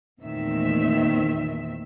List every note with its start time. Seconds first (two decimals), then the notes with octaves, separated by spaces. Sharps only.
0.22 E2 A#2 D#3 A3 C4 E5